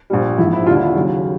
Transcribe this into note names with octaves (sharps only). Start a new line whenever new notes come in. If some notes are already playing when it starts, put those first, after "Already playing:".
A#1 A#2 G3
A#1 G#2 F3 E4
E4
D#2 D3 G3 F4
E4
D#2 C#3 F#3